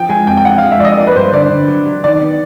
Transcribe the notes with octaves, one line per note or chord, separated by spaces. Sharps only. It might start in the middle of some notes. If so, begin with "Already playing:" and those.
Already playing: F3 G5
G#3 G#5
F2 G5
G5
F3 F#5
F5
G#3
E5
F3 D5 D#5
A#3 D5
B4
G2 C5
D3 D5
D3
F#3
F#3
D#3 D5
B3